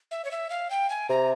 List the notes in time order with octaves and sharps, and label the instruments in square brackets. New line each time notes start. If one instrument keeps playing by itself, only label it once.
[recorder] E5
C#5
E5
F5
G5
G#5
[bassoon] C3 [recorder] A#5